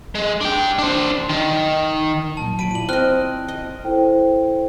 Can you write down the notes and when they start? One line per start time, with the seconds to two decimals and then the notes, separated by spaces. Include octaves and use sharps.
0.15 G#3
0.41 D4 G5
0.79 D4 C5
1.30 D#3
2.37 C2 A#2 F#3 A5
2.59 A#2 F#3 B5 D7 D#7
2.71 E4 F4 D5 D#7 F#7
2.89 C4 D#5 F6 F#6 G7
3.48 D#5
3.84 E4 A4 C5 G5